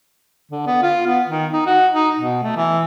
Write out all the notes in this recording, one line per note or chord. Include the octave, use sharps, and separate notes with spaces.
D3
B3
F4
B3
D#3
D#4
F#4
D#4
B2
A3
E3